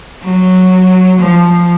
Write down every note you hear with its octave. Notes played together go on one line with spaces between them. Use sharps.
F#3
F3